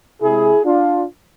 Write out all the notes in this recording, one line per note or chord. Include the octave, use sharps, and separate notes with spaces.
C3 G#3 E4 G#4
D4 F4